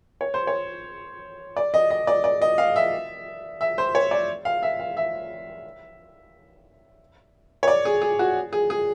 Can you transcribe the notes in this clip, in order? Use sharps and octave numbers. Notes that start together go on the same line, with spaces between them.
C#5
C5
C#5
D5
D#5
D#5
D5
D5
D#5
F5
E5
E5
C5
C#5
D5
F5
E5
F5
E5
C#5
D5
G#4
G#4
F#4
G#4
G#4